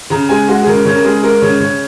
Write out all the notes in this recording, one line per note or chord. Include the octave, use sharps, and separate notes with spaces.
C#3 A#5
G#3 G#5
G#3 F#4
G#4
C#3 A#4
C#3 C#5
A#4
G#3 G#4
G#3 A#4
C#3 C#5
C#3 C#5